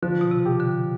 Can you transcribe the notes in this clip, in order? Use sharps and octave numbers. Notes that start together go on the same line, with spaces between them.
D3 F3
B2
C3
G4
D3